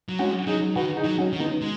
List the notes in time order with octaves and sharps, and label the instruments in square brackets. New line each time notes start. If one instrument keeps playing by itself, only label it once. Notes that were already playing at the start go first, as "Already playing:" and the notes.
[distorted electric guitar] F#3
[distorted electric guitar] G#3 [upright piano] C#4 F#4
[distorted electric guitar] F#3 [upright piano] D#4 G#4
[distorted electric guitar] D#3 [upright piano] F#4 B4
[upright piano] D#4 G#4
[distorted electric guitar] F#3
[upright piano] C#4 F#4
[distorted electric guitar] D#3
[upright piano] B3 D#4
[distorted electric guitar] G#3